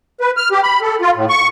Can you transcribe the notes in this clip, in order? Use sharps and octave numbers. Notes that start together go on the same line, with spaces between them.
B4
F6
G4
B5
A4
F4
A2
C#6